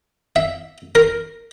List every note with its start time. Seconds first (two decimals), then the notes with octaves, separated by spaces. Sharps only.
0.36 E5
0.95 A#4